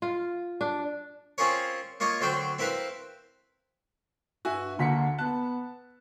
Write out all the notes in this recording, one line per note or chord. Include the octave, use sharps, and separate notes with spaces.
F4
D4
C4 C#4 F4 G#4 A#4 C#5
A#3 F4 C#5 D#5
D2 F#3 C4 C5 G5
C4 E4 A#4 B4 F5
G2 F#4 E5 G#5
D2 D3 A#3 F#4 C6 B6 C#7
B3 A5 F#6